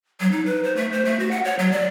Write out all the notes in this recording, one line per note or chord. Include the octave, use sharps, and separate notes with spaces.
F#3
D#4
B4
C5
A3
C5
A3
F#4
F#5
C#5
F#3
D5